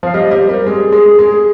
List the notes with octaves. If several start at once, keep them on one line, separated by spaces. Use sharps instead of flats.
F3 F5
G3 D#5
G3 C5
G3 A#4
G#3 G#4
G#3
G#3